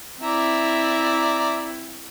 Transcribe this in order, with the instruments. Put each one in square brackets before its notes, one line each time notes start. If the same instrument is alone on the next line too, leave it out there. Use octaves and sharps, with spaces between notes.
[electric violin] C4 E4 [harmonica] D5 E5 A#5